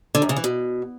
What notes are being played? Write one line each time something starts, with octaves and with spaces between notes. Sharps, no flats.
D3
F#2
C#3
E3
B2